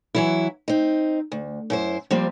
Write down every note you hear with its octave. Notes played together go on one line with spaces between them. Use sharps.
E3 F#3 E4
C4 D#4
D2
F#2 E4 C5
F3 G3 A#3 C4